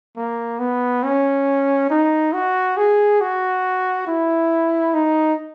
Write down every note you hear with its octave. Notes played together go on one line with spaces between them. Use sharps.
A#3
B3
C#4
D#4
F#4
G#4
F#4
E4
D#4